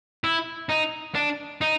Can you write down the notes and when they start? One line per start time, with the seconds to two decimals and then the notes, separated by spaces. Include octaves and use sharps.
0.24 E4
0.69 D#4
1.15 D4
1.61 D#4